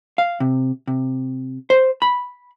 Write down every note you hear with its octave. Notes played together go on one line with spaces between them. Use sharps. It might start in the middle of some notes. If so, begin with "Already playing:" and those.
F5
C3
C3
C5
B5